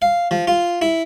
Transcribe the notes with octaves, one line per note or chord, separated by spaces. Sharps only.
F5
F3
F4
E4